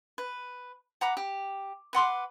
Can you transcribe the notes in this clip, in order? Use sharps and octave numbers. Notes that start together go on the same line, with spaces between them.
B4
F#5 A#5 B5 D6
G4
B4 F#5 C6 D6